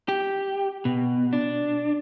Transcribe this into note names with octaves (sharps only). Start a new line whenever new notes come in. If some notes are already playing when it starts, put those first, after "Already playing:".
G4
B2
D4